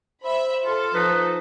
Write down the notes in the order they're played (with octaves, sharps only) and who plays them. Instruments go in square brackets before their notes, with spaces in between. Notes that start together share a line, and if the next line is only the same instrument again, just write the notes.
[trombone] C5 [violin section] E5 B5
[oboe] F4 [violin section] A4
[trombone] F3 [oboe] D#4 [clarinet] B4